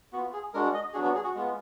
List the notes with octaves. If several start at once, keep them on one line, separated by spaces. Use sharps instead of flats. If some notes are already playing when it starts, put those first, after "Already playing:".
B3 F4 F#4
G#4
G#3 D4 F#4 A#4
D#5
F#3 B3 D4 F#4 G#4
F#4
G#4
F#4
G#3 B3 F4